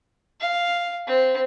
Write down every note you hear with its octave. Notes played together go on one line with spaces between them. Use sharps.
F5
C4